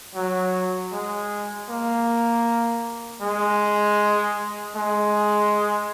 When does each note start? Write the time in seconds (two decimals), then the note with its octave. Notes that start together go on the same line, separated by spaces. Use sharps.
0.15 F#3
0.92 G#3
1.69 A#3
3.21 G#3
4.75 G#3